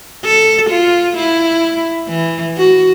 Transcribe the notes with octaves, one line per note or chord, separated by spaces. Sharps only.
A4
F4
E4
E3
F#4